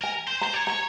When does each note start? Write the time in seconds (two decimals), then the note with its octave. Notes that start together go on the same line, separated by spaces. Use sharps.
0.02 A#4 G#5
0.28 C5
0.41 C5 A#5
0.53 C#5
0.67 C#5 A#5